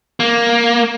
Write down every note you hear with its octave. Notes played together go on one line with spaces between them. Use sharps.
A#3